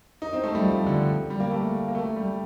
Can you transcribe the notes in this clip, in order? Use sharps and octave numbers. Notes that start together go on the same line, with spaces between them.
D#4
C4
A3
G3
F3
D3
G3
A#3
A3
A#3
A3
G3